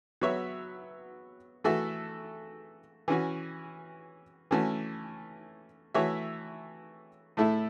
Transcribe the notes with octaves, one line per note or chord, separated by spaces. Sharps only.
F#3 B3 F#4 C#5 E5
E3 A3 F#4 A4 E5
E3 C#4 F#4
E3 A3 C#4 F#4
E3 A3 F#4 C#5 E5
A2 A3 E4 A4 E5